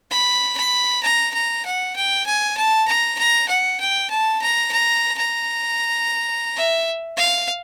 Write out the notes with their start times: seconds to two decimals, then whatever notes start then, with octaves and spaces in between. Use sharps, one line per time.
0.11 B5
0.57 B5
1.03 A#5
1.34 A#5
1.65 F#5
1.96 G5
2.26 G#5
2.57 A5
2.88 A#5
3.18 A#5
3.49 F#5
3.80 G5
4.10 A5
4.42 A#5
4.72 A#5
5.18 A#5
6.57 E5
7.17 F5